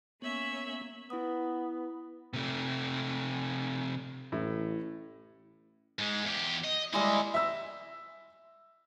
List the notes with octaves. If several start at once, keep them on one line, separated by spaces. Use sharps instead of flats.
A#3 B3 C#4 C#5 E5
B3 E4 D#6
C3 A3
A1 A2
G#2 G#3
E2 G4
D#5
D#2 G3 G#3 A#3 E4
E5 E6